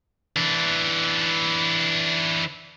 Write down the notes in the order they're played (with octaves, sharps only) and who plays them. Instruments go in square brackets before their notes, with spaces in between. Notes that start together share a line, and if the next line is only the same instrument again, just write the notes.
[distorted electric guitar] E3 D4